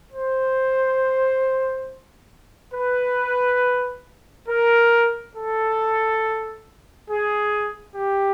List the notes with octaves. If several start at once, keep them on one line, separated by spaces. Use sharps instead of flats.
C5
B4
A#4
A4
G#4
G4